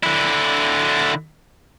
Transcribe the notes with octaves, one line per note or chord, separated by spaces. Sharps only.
D3 E4